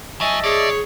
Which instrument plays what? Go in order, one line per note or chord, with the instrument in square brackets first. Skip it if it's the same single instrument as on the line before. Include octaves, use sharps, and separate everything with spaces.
[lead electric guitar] F#3 [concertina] D#5 E5 A5 [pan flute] G#5
[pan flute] G#4 [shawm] C#5 [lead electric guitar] D5